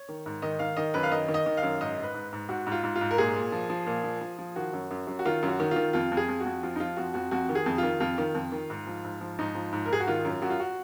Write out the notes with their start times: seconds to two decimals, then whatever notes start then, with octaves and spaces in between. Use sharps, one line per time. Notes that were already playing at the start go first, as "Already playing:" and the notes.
Already playing: C#5
0.09 D#3
0.26 G#2
0.42 D#3 D#5
0.59 D#3 F5
0.77 D#3 D#5
0.94 F#2 B4
1.03 F5
1.12 D#3 D#5
1.28 D#3
1.34 D#5
1.46 D#3
1.57 F5
1.63 F#2
1.81 G#2 D#5
1.97 G#2
2.03 B4
2.14 G#2
2.33 G#2
2.49 G#2 F#4
2.67 G#2
2.72 F4
2.84 G#2
2.95 F4
3.01 G#2
3.11 A#4
3.18 A#2 G#4
3.36 A#2
3.52 F3
3.70 F3
3.87 A#2
4.04 F3
4.21 F3
4.38 F3
4.56 D#3 F#4
4.73 F#2
4.91 F#2
5.07 F#2
5.19 F#4
5.25 D#3 F4
5.43 F#2
5.48 F#4
5.60 D#3
5.71 D#3 F4
5.93 F2 F4
6.12 F2
6.17 G#4
6.28 F2
6.40 F2 F#4
6.63 F3 F4
6.76 D#4
6.80 F3 F4
6.97 F2 F#4
7.14 F2 F#4
7.31 F2 F#4
7.49 D#3
7.55 G#4
7.66 F2
7.78 D#3 F4
8.00 F2 F4
8.18 D#3
8.35 F2
8.52 D#3
8.70 G#2
8.87 F3
9.04 G#2
9.21 F3
9.39 G#2 D#4
9.55 F3
9.72 G#2
9.86 A#4
9.90 G#2 G#4
10.00 F#4
10.07 D#3 F4
10.25 F#2
10.42 F#2 F#4
10.50 F4
10.60 F#4